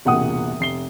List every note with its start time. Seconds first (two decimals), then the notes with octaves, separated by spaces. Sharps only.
0.05 E1 C2 A#2 F#5 G5 D#6
0.60 F1 C7 G7